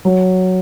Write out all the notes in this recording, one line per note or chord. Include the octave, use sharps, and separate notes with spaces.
F#3